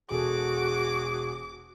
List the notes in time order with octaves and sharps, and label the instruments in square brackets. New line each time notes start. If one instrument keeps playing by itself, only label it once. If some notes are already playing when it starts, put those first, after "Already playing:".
[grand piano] E1 A4 [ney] F#4 [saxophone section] G#4 [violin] D6